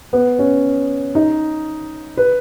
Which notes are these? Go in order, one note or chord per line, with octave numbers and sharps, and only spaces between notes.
B3
C#4
D#4
B4